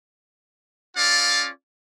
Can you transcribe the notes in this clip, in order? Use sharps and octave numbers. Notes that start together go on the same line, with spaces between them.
C#4 F4 A4 D5 F5